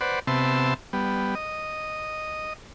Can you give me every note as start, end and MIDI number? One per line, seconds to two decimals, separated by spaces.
0.01 0.19 71
0.01 0.19 72
0.01 0.19 74
0.01 0.19 78
0.27 0.74 48
0.27 0.74 59
0.27 0.74 76
0.27 0.74 81
0.27 0.74 84
0.93 1.35 55
0.93 1.35 59
1.35 2.53 75